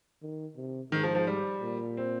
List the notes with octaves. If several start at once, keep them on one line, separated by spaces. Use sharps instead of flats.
D#3
C3
G#2 D#3
F3
F3
G3
A#2
C4